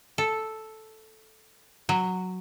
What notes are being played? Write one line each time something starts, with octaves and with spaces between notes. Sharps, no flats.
A4
F#3